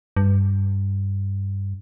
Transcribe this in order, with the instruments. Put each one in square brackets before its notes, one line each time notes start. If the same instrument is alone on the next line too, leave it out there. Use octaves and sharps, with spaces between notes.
[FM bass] G2